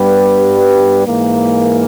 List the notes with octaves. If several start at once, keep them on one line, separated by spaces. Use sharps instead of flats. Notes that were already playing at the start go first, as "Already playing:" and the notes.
Already playing: G2 G3 B3 G4 B4
G#2 E3 A#3